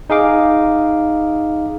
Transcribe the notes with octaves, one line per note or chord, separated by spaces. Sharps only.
D#4 G#4 F5 D6